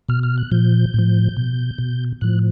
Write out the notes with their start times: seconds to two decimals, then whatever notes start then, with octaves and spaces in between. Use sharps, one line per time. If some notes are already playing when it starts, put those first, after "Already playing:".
0.09 B2 F6
0.23 F6
0.38 F#6
0.51 A#2 F3 G6
0.94 A2 F3
1.37 B2
1.78 B2
2.21 A2 F3 F#6